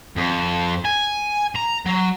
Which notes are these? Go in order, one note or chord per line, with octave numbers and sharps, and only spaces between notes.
F2
G#5
A#5
F#3